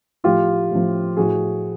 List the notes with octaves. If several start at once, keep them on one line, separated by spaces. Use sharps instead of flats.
A2 F3 F4 G4
A2 F3
A2 F3 F#4 G#4